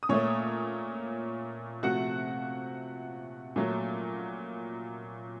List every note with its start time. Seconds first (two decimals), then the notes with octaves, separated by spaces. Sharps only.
0.03 D#6
0.09 A#2 A3 C#5 C#6
1.83 C3 F3 A3 F#4 F#5
3.56 A#2 F#3 A3